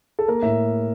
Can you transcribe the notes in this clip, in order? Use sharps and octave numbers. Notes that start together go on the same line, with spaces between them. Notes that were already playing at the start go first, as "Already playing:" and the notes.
A4
A#3 A#4
A2 E5